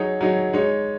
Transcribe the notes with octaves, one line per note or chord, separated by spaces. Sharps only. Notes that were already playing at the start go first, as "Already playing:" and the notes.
Already playing: F#3 D#4 G#4 C#5
F#3 D#4 G#4 C#5
G#3 D#4 G#4 C#5